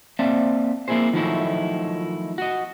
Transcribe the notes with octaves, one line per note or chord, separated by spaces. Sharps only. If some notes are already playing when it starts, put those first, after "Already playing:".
A#3 C4 D5 E5 A5
A#3 C4 E4 F#4 G#4 C5
D#3 F3 F#3 A3 D#4 E4
F#4 D#5